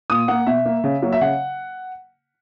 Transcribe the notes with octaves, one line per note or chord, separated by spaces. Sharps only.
A#2 D#6
A#3 F#5
B2 E5
A#3
C#3
F#3 A#3
E5
C#3 F#5